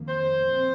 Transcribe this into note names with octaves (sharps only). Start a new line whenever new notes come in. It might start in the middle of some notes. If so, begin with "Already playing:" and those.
Already playing: F2 D#3 A#3
C5
A#2 F3 C4